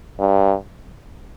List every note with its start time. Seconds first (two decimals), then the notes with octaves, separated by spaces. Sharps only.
0.19 G2